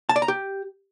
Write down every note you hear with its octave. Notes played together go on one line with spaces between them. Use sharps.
A5
D5
A#5
G4